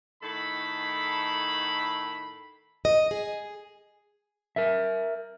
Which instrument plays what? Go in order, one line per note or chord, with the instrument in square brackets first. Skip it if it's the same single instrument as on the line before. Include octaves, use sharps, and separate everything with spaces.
[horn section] A2 D#3 A4 B5
[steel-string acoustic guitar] D#5
G#4
[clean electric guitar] A#4 E5